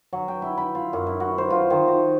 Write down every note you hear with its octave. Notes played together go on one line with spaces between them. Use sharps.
F#3
G5
E4
B5
F4
F#2
E4
F#4
C5
F4
D#3
F#4